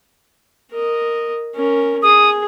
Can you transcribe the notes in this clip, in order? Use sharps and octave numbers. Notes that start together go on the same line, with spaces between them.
A#4 D#5
C#4 A#4
G#4 D#6